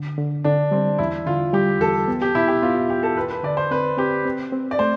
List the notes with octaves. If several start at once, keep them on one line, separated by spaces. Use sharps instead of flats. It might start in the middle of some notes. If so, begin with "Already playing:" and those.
Already playing: D3
D3
D3 D4
G3 C4
E2 E4
D3 F4
G3 G4
E2 A4
B3
G4
B2 E4
G4
B3 F4
E4
E2 G4
A4
E2 B4
B4
D3 D5
C5
C4 B4
C4 G4
C4
C4
D5
A3 C5